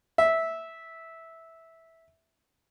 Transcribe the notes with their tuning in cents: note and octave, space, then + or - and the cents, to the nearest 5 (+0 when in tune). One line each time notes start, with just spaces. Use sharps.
E5 -10